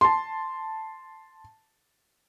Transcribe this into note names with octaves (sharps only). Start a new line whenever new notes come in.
A5 C6